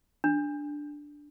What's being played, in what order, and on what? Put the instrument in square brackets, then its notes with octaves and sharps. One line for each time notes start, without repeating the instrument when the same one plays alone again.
[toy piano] D4